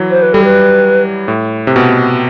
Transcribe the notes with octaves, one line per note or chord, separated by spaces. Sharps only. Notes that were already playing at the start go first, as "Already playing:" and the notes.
Already playing: E3 F#3
C5
B4
G3 A4
B4
A2
C3
B2